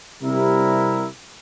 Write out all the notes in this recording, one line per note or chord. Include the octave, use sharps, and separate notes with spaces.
C3 G3 E4 A#4